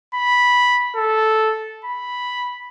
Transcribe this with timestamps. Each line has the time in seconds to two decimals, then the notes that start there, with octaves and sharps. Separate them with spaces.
0.15 B5
0.96 A4
1.85 B5